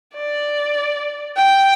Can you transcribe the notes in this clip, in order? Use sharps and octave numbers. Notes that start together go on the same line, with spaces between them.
D5
G5